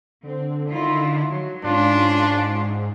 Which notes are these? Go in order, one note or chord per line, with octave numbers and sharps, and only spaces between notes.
D3 C4
D#3 E4 F4
F#3
G#2 C#4 D4 F4